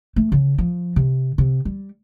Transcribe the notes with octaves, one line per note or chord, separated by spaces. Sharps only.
A3
C#3
F3
C3
C3
G3